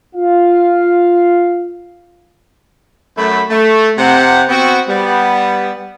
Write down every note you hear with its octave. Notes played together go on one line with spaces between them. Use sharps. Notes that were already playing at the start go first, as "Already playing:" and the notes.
F4 F5
F#2 A3 B5
A3
C3 C5 F#5
B3 C4 F#4
G3 B3